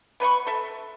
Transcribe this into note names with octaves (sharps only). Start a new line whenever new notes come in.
B3 B4 D#5 C#6
A4 E5